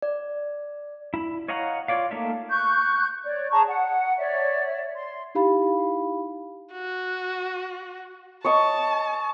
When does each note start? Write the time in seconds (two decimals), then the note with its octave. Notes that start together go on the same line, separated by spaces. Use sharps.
0.02 D5
1.14 E4
1.48 C#5 D#5 F5 F#5 A#5
1.88 F4 C#5 D5 F5
2.11 A3 A#3 D#4 E5 F5
2.49 C#6 F#6 G6
3.24 C#5 D5
3.50 G#4 A5 A#5 C#6
3.66 F#5
4.17 C#5 D5 E5
4.95 C6
5.35 D#4 E4 G4 F5 B5
6.72 F#4
8.45 C#5 D#5 A5 C#6